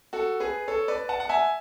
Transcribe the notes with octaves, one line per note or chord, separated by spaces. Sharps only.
F#4 A4
G#4 B4
A4 C#5
B4 D5
F#5 A5
F#5
E5 G#5